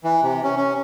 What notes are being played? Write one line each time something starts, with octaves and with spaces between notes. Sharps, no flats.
E3
C3
C#4
C#4